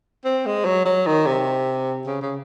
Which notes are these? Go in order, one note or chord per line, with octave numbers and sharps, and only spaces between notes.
C4
G#3
F#3
F#3
D#3
C3
C#3
C#3